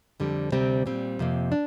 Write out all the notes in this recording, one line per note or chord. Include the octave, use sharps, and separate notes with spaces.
F2 D3 G3
D2 C3 G3 C4
A#2 G3 C4
F2 C3 A#3
D4